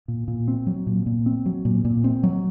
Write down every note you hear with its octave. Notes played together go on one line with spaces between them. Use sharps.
A#2
A#2
C4
F#3
A#2
A#2
C4
F#3
A#2
A#2
C4
F#3